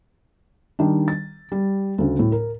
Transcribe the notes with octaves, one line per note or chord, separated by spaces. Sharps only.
D#3 G3 D4
A6
G3
D2 C#3
A2
A#4